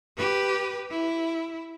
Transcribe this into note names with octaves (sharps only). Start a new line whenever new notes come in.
G4 B4
E4